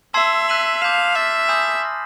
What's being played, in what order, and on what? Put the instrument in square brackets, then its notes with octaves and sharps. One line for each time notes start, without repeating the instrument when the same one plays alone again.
[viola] E5 [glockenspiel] A5 C6 E6 G#6 C7
[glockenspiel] F#6 B6 D#7 F#7
[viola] F5 [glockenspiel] A5 D6 G6 B6 E7
[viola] E5 [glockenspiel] F6 A6 C7
[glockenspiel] G#5 B5 D#6 G6
C6 F6 A#6